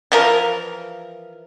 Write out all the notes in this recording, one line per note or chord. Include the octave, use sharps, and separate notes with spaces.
E3 F3 A#4